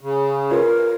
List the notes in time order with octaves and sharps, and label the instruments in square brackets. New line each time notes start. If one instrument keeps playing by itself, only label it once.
[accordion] C#3
[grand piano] F4 B4 C#5 [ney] A#4